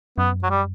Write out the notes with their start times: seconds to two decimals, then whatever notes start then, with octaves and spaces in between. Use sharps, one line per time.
0.18 F#2 B3
0.43 F#3
0.50 G3